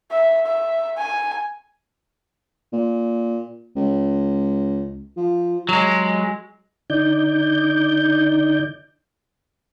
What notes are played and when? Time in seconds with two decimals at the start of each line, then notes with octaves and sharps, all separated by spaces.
0.11 E5
0.46 E5
0.97 G#5
2.73 A#2
3.76 C#2
5.17 F3
5.69 F#3 G#3
6.90 D3 D#4 D5 G6